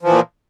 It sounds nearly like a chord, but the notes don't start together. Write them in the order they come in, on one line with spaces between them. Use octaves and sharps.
F3 E3 A#2